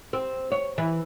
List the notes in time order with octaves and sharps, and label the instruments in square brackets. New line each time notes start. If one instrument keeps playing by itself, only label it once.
[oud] C4
C#5
E3